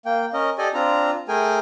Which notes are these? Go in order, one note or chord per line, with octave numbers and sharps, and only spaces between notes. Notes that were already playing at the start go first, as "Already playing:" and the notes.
A#3 G5
C#4 A#4 D#5
G4 A4 D5 D#5 G#5
C4 D4 F4 A#5
A3 G#4 A#4 G5 G#5